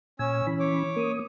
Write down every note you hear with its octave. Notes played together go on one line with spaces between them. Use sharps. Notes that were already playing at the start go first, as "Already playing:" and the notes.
A#2 C#4 G#5 E6
E3 C#4 B5
C#5 D6
A#3 D#6